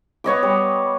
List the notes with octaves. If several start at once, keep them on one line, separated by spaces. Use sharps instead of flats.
B3 C#5 D#5 D6
G3